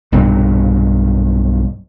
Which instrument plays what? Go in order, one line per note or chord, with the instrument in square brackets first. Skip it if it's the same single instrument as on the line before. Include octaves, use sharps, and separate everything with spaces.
[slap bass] B1 G2 A#2 F#3